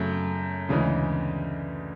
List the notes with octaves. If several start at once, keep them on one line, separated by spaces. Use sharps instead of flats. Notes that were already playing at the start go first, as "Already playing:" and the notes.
Already playing: F#2 C#3 F#3 A3
D2 C#3 E3 G#3